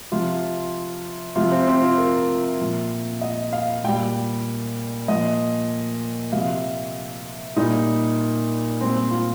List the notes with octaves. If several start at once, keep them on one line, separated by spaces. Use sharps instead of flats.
C3 F3 F4
C3 F3 F4
C4
C4
F4
A#4
A#2 F3
D#5
F5
A#2 G3 G5
A#2 F3 D#5
C3 F3 F5
A#2 G3 D#4
A#2 G3 C4
C4
F4